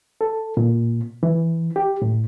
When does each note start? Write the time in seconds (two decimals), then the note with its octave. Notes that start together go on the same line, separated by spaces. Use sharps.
0.21 A4
0.57 A#2
1.23 E3
1.76 G4
2.02 A2